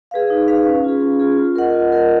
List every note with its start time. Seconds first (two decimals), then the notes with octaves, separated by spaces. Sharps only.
0.11 G#4 B4 F5
0.30 D#4
0.48 G#4 B4 F5
0.65 C#4
0.84 F4 G#4
1.02 C#4
1.20 F4 G#4
1.38 F4
1.56 A#4 D#5 F#5
1.74 F4
1.92 A#4 D#5 F#5